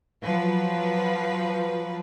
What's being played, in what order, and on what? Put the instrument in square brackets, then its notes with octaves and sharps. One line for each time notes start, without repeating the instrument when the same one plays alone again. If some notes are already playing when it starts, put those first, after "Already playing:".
[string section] F3 F#3 B4